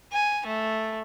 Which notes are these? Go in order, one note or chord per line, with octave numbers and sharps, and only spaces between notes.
G#5
A3